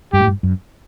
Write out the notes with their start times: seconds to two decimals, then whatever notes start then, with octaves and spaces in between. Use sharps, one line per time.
0.13 G2 G4
0.20 A2
0.27 G2
0.43 F#2